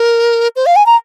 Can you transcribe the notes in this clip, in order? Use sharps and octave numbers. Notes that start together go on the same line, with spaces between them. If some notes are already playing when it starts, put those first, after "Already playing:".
Already playing: A#4
C5
F5
G#5
A#5